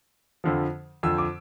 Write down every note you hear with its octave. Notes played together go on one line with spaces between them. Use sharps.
F2 D3 F3
F2 D3 F3 E6
D6